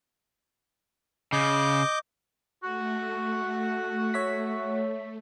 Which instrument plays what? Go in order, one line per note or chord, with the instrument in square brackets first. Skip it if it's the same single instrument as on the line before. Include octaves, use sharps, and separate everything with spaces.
[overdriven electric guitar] C#3 [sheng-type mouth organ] D#5 D6 G6
[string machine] A3 [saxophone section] F#4
[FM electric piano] C#5 E5 B6